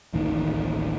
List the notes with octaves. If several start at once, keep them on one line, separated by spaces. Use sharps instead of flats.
D1 A1 D#2 D#3